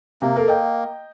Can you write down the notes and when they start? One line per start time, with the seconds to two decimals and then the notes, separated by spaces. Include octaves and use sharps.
0.22 C3 A#3
0.36 A4 A#4 F5
0.48 D#5 G5